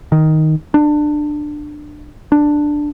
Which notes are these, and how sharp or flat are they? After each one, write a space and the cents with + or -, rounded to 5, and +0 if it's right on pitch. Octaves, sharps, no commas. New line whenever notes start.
D#3 +5
D4 +20
D4 +5